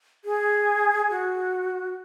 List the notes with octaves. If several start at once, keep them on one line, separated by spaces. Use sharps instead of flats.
G#4
F#4